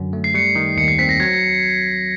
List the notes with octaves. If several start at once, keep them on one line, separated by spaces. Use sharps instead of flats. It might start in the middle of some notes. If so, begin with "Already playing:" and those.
Already playing: F#2 D3 F#3
A3
C7
G3 C#7
D#3
D#2 C#7
C7
C4 B6
A#6
F#3 G#6